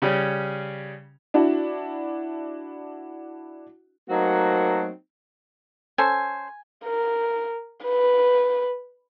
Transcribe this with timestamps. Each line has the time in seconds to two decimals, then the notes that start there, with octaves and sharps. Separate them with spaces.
0.02 C#3 G3 C#4
1.34 D4 E4 F#4
4.09 F#3 A3 A#3 C4 D#4 F#4
5.98 C#4 A4 C5 G#5
6.85 A#4
7.86 B4